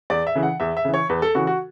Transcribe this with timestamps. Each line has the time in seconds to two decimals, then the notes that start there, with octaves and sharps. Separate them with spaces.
0.10 E2 D5
0.27 E5
0.35 C#3 E3
0.43 F#5
0.60 E2 E5
0.77 E5
0.85 C#3 E3
0.94 C#5
1.09 E2 B4
1.22 A4
1.35 C#3 E3 F#4
1.47 F#4